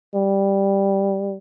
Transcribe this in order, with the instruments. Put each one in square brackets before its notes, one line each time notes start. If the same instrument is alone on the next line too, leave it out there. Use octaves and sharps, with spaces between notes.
[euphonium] G3